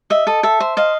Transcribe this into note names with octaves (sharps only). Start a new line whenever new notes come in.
D#5 E5
A4 D#5
A4 E5
C5
D#5 F5